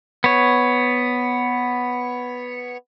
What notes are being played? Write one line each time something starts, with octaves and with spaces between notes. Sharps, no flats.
B3 C#5